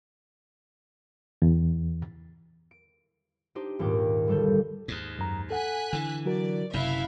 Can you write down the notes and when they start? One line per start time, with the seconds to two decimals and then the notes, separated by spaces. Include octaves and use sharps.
1.42 E2
2.71 D7
3.55 D4 D#4 G4 C5
3.79 D#1 D#2 G#2 G5 D6
4.28 G1 G3 A4 G6
4.88 D#2 G#2
5.19 F#2 A#5
5.51 A4 F#5 G#5 F#6 B6
5.93 D3 E3
6.26 F#3 F#4 A#4 D5
6.73 F#1 F#2 C3 E4 E5 F5